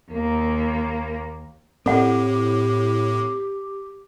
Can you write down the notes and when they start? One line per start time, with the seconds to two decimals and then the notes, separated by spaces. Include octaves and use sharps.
0.12 D#2 A#3
1.86 A2 C4 G4 A4 F#5